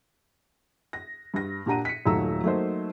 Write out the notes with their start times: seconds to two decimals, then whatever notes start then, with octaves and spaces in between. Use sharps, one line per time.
0.93 A#6
1.34 G2 A#6
1.66 A#2 D4 G4 F#5 A#5 D#7
1.85 B6 C#7
2.06 D#1 D#3 F#3 A3 A#5 E6
2.44 F#3 A3 A#3 D#4 C5